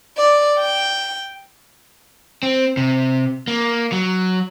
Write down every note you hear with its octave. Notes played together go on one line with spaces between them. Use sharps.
D5
G5
C4
C3
A#3
F#3